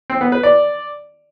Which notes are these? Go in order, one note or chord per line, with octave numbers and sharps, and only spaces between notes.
C4
B3
B4
D5